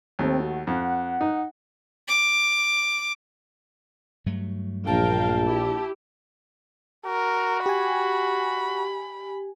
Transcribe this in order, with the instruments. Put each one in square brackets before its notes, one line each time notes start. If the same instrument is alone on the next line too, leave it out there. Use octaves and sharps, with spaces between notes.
[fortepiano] D#2 A3 [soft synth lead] C4
[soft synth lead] F#4
[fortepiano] F2 [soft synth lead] F#5
[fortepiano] D#4
[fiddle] D6
[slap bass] G2 F#3 A3
[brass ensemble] A#1 [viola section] A#4 F5 G5 [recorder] A5
[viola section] E4 G4
[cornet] F#4 [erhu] A#4
[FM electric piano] G4 G#5 [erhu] B5